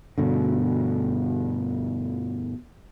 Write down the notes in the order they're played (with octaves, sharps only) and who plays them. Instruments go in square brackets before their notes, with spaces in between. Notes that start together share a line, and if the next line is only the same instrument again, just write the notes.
[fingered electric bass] G2 B2 D3